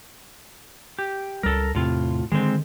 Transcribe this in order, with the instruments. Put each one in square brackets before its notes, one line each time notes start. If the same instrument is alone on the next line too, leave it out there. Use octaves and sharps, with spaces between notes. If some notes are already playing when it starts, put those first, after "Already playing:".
[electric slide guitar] G4
[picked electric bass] C#2 G3 [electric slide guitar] A4 A#4
[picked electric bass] E2 C3 C4 [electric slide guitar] A2 F4
[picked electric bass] D3 D#3 [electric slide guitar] G#3 C4